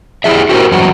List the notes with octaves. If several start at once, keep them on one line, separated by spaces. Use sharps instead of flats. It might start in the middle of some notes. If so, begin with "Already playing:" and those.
E4 G4 G#4 E5
F#4 G4 A4 A#4 C5
E2 G2 F#3 F#4